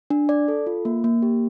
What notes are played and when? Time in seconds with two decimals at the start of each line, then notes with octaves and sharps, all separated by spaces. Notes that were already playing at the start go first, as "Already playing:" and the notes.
0.10 D4
0.29 D5
0.48 A4
0.66 F4
0.85 A#3
1.04 A#3
1.22 G4